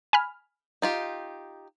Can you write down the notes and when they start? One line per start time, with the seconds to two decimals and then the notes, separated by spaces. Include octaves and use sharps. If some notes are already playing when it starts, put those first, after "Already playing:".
0.13 G#5 B5 F6
0.82 D#4 F4 G4